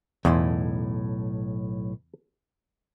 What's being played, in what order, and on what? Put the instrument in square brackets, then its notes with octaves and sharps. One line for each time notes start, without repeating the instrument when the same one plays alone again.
[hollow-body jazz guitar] B1 A2 C6 [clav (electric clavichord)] E2